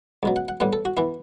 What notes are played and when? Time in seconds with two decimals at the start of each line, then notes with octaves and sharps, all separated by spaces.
0.23 C#2 B2 F#3
0.36 F#5
0.48 F#5
0.60 A2 G3 B3 F#5
0.73 A4
0.85 F#4
0.97 E3 B3 E4